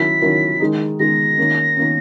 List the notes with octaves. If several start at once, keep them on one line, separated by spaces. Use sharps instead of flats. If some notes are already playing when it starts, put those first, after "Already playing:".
Already playing: D#3 F#3 C#4 E4 A#4 B6
D#3 F#3 C#4 E4 A#4
D#3 G#3 D#4
D#3 G#3 D#4 A#6
D#3 A#3 C#4
D#3 A#3 C#4